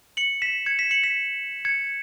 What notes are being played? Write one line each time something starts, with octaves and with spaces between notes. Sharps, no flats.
C#7 F#7
B6 E7
G#6 C#7
B6 E7
C#7 F#7
B6 E7
G#6 C#7